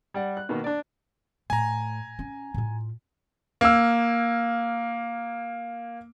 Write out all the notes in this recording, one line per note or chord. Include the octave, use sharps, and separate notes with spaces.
G3 D5 F#5
F#6
B2 D#3 A#3 B3
D4 D5
A2 G#5 A#5
C#4
A2 F4
A#3 E6